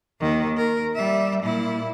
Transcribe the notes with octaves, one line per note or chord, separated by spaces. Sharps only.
D#2 D#3
A#4
G3 E5
A#2 E4